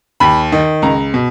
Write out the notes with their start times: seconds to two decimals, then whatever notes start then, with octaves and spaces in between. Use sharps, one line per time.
0.20 D#2 B5
0.52 D#3
0.82 C#2 A#5
1.14 B2